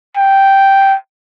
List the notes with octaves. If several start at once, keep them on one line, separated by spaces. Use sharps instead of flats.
G5